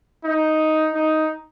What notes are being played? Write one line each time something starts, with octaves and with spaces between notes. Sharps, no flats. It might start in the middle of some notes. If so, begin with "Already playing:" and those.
D#4
D#4